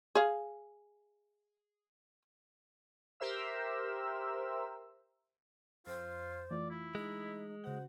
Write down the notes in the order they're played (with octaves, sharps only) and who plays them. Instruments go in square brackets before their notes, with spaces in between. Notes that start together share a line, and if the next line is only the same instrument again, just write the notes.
[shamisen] G#4 F5
[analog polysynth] G4 A#4 C5 E5 E6
[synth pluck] F2 [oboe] F4 [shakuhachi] C5
[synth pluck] E3 A3 F4 [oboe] D5
[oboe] E4
[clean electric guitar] G#3 [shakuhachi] D#4
[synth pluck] C#3 F#4 F#5 [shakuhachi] C5